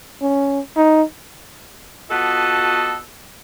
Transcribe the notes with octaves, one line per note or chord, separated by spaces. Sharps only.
C#4
D#4
B3 F4 F#4 A4 D#5 A5